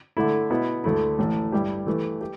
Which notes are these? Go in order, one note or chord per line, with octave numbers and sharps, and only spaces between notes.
D3 A3 E4
B2 B3 E4
D2 D3 A3 E4
A1 A2 E3
G2 G3 E4 G4
E3 A3 E4 G4 B4
G4